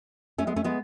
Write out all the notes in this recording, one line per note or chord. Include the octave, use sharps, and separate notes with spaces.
A3 C#4
G#3 B3
A3 C#4
G#3 B3